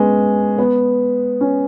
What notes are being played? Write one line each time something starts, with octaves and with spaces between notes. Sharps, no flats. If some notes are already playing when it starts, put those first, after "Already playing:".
Already playing: G#3 B3 C#4
B3
C#4